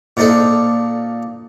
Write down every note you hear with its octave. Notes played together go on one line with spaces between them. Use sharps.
A#2 F3 D4 D#4 A4